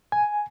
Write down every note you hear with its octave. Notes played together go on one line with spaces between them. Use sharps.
G#5